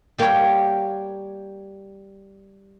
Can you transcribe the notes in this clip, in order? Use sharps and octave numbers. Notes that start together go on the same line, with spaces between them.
G3 A#3 G4 A#4 C#5 F5